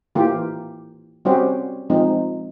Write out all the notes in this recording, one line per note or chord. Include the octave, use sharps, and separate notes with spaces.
E3 A#3 F4 G4
G3 C4 C#4 F#4 G4 C5
F3 G#3 C4 D#4